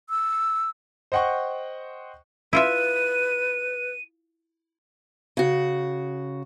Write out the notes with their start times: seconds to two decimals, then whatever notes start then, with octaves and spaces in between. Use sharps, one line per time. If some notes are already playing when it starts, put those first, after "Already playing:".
0.10 E6
1.12 C5 D#5 F#5 G5 C#6
2.53 E4 F4 B4 E5 D#7
5.37 C#3 F#4